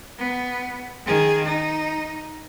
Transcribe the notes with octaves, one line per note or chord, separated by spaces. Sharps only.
B3
D#3 G#4
D#4